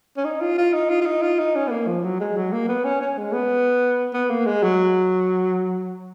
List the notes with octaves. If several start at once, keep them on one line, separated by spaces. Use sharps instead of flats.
C#4
D#4
F4
F4
D#4
F4
F4
D#4
F4
D#4
C#4
B3
A#3
F3
F#3
G#3
F#3
A#3
B3
C#4
C#4
G#3
B3
B3
A#3
G#3
F#3